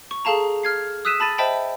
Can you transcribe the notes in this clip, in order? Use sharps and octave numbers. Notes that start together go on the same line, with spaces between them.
C#6
G#4 A4 F5 A5 A#5
F6 G#6 C7
D#6 E6 F#6 B6 D#7 E7
A5 B5 A6 D#7
C5 D#5 E5 G5 A5 B5